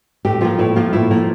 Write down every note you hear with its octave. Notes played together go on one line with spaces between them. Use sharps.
A2 G4
F3 A#3 F4
A2 E4
F3 A#3 F4
A2 E4
F3 A#3